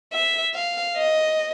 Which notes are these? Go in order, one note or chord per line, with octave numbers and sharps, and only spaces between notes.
E5
F5
D#5